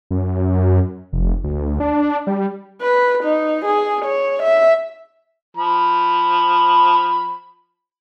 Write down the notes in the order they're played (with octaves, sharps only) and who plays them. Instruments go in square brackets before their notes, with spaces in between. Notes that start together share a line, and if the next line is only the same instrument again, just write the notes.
[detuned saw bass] F#2
F1
D2
D4
G3
[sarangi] B4
D#4
G#4
C#5
E5
[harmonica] F3 B5